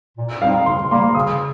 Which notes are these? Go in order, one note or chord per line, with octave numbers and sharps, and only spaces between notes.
A#2
G3 C4 D#4 F5
C#3 C6
G3 A#3 C6
C#3 D#6